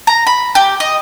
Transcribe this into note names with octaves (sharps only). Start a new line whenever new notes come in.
A#5
B5
G4
D#5